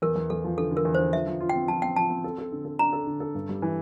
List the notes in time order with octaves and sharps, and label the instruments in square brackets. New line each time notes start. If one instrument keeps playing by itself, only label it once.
[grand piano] E2 [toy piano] A#4
[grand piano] E2
[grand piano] E2 [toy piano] A4
[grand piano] F3
[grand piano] D3 [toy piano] A4
[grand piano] D3
[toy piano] A#4
[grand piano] E2
[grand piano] D3 [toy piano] C5
[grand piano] F3 [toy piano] E5
[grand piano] F3
F4
[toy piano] G5
[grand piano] C4
[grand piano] F3 [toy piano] A5
[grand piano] C4 [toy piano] G5
[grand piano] F3 [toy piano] A5
[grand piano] C4
A4
A4
D3
A4
[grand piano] D4 [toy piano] A#5
[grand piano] A4
D3
A4
G2
G3
E3